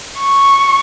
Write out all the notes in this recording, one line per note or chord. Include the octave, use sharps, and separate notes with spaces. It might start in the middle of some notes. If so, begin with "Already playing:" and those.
C#6